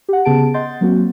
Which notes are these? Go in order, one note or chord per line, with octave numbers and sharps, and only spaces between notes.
G4 F#5
C#3 B3 G#4 A5 D7
D#5 F#5 C6 G6 A6
F#3 A#3 C4 F#4